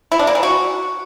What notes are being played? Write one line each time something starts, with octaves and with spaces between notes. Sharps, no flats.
E4
D4
A#3
E3
F#4